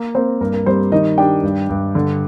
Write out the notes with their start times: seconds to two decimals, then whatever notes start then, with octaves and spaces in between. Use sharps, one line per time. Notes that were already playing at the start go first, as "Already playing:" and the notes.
Already playing: A#3
0.15 A#3 C4 C5
0.41 G2 A#4
0.53 A#4
0.66 G3 C4 C5
0.92 D#3 D#4 D#5
1.18 D4 G4 G5
1.43 G2
1.69 G2
1.95 D3